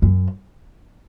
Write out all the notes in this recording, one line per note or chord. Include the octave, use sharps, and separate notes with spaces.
F#2